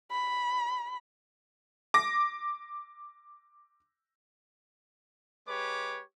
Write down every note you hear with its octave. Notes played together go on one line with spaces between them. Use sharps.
B5
D6 A#6
G#3 G4 B4 C#5 D6